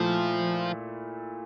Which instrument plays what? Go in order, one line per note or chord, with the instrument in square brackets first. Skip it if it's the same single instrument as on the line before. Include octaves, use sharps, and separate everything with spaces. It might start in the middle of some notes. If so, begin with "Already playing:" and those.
Already playing: [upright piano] A#2 A3 E4 [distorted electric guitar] F3